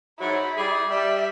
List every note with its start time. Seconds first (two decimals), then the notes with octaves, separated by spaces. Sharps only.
0.19 G#2 F#3 E4
0.56 G3 G#4
0.90 G3 E5